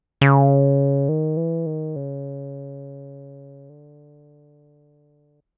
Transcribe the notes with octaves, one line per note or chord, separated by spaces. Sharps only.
C#3
D#3
E3
D#3
C#3
D3